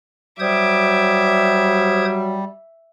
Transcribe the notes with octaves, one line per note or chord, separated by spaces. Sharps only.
F#3 G3 C5 E5 D6 D#6 G#6